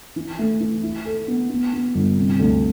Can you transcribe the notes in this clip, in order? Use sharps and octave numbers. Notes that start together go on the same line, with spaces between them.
E3
A3
E3
E4
A4
B3
B3
B3
G1
C3
D2